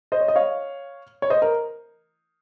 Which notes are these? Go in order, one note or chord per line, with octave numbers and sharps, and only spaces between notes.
C5 D#5
C#5
D#5
C#5 F5
C#5
C5 D#5
A#4